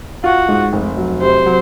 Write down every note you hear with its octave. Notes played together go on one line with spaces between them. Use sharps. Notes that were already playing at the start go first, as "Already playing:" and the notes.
F4 F#4
G#2
F1
F#3
C3 C5
F#3